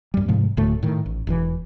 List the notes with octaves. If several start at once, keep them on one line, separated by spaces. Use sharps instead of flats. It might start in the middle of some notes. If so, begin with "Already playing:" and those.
F#2 G3
G#2 C3 F3 G#3
D1 D2 A2 A3
A2 D#3
A1
E1 C3 E3